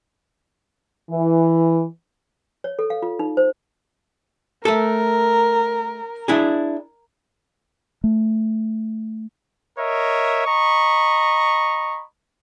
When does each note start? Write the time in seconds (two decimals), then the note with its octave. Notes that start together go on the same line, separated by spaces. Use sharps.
1.10 E3
2.64 C#5
2.79 A4
2.90 F5
3.02 F4
3.19 D#4
3.37 C5
4.65 A3 A4 A#4
6.28 D4 E4 G#4
8.04 A3
9.78 A#4 C#5 D#5 E5
10.45 D#5 A#5 B5 C#6